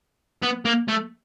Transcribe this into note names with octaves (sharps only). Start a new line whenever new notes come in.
B3
A#3
A3